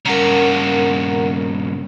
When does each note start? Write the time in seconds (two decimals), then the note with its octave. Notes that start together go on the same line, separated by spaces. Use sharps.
0.05 G2 C#3 A#4 F#5 A#5